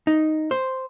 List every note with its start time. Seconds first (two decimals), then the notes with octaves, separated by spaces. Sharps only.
0.07 D#4
0.51 C5